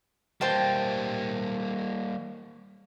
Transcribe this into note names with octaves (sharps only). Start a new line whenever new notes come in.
G3 A#3 C5 G5 A5